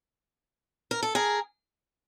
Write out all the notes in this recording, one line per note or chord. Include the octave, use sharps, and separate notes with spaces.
A#4
A4
G#4 A#4